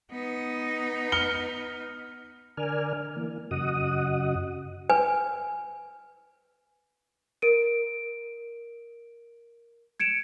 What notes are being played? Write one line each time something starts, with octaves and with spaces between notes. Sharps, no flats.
B3 D#4
F6 C#7 G7
D3 A#4 D5 G#5 F6
E3 A#3
F#2 C#3 F#4 D#5 F#5 D#6
B4 G#5
A#4 D7 D#7
G#6 C#7 D7 E7